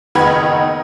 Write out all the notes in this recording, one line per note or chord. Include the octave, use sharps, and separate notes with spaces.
F#1 D#3 B3 D#4 B5 G#6